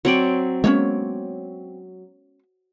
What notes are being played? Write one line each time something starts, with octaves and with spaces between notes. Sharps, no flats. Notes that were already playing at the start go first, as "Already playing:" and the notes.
F#3 C4 C#5 D5
G#3 A#3 B3 C#4 D4 C#5